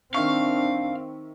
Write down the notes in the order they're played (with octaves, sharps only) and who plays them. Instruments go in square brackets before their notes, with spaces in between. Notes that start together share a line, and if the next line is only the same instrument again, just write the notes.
[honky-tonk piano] D#3 E5 C#6 [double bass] C4 [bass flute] D4 [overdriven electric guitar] F5